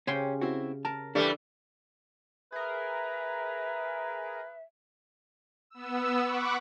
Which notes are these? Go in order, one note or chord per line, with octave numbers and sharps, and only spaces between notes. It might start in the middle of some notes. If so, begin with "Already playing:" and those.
C#3 C#4 G4 C6
C4 E4 F#4
A#4 A5
E3 G3 A3 D4 A4
G#4 A#4 B4 E5
B3 E6
F#5 B5 C#6 D6 F#6